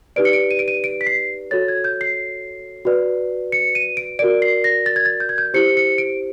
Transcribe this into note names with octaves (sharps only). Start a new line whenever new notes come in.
D#4 G4 B4 D5 D7
C#7
D7
D#7
D7
D#7
D7
B6
C7
F#4 A4 C#5 A6
G#6
G6
C7
F#4 B4 D5
C#7
D#7
D7
F#4 A#4 D5 D7
C7
A#6
A6
G#6
A6
G6
G#6
G6
E4 G4 C5 C#7
C#7
D7